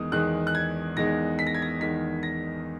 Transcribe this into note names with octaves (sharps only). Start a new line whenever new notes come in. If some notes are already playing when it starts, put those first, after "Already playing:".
Already playing: E2 D#3 G#3 D#6
E2 D#3 G#3 F#6
F#6
G#6
E2 D#3 G#3 A#6
B6
A#6
G#6
A#6
E2 D#3 G#3 B6
A#6